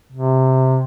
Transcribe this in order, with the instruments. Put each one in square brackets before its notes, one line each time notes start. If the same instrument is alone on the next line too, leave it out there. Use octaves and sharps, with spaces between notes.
[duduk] C3